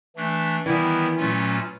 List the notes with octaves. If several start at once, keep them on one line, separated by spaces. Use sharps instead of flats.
E3 A3 D4
D#3 E3 G3 B3 E4
A#2 F#3 A3 C#4 F4